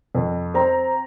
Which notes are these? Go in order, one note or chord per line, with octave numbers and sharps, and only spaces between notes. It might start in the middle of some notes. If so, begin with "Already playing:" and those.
F2
C4 A#5